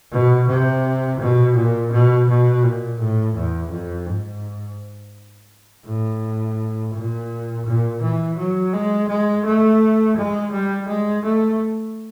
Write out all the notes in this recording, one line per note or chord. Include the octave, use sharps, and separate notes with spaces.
B2
C3
B2
A#2
B2
B2
A#2
A2
E2
F2
G#2
A2
A#2
A#2
E3
F#3
G#3
G#3
A3
G#3
G3
G#3
A3